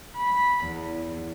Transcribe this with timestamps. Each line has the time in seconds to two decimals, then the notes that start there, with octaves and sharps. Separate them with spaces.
0.18 B5
0.66 E2